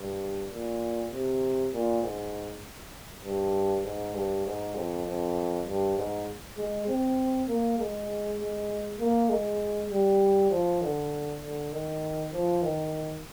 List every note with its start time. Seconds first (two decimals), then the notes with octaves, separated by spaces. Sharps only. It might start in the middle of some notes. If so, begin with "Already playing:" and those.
Already playing: G2
0.51 A#2
1.12 C3
1.73 A#2
2.02 G#2
3.24 G2
3.84 G#2
4.15 G2
4.46 G#2
4.75 F2
5.06 F2
5.67 G2
5.97 G#2
6.57 G#3
6.88 C4
7.48 A#3
7.79 G#3
8.38 G#3
8.99 A#3
9.29 G#3
9.91 G3
10.51 F3
10.81 D3
11.42 D3
11.72 D#3
12.32 F3
12.62 D#3